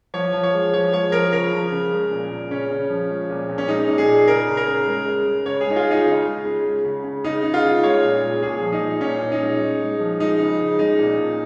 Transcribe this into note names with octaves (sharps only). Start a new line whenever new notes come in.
F3 C#5
F3
C#5
G#3
F3 C#5
G#3 C#5
F3 A#4
C#3 A#4
F3
C#3
G#3
A#2
A#2
C#3 C#4
C#3
F3
G#3
A#2
A#2
C#4
G#3 D#4
A#2
G#4
A#2
C#3 A#4
C#3
A#4
C#3
G#3
G#3
G#3
C#3 C#5
G#4
G#3 D#4
F4
G#3 D#4
C#3
G#3
C#3
G#3
C#3
C#3
C#3 D#4
C#3
F4
C#3
G#3 C#5
A#2
G#3
A#2 G#4
F3
D#4
F3
A#2 C#4
A#2
D#4
G#3
G#3
G#3
F3
G#3 D#4
C#3
C#3
G#3 D#4
A#2
A#2